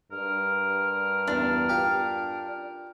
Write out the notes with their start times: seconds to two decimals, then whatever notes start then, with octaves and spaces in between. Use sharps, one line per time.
0.12 G2 A#4
1.27 E2 D4
1.69 F4 G4